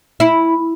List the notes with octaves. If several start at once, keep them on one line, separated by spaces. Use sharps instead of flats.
E4